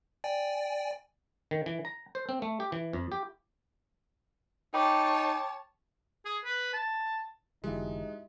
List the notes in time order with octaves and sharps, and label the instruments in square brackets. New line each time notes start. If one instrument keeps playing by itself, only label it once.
[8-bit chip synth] D5 G5 G#5
[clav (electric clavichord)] D#3
E3
A#5
C5
C4
A3
G4
E3
F2
G4
[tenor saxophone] D#4 [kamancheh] C#5 A5 [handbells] G5 B5 D6
[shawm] G#4
B4
A5
[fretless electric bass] F1 D3 E3 [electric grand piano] G#3 [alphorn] D#4 [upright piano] E4 F#4 G4